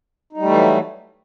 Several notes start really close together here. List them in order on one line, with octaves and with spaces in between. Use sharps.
D#4 G3 A3 E3 F#3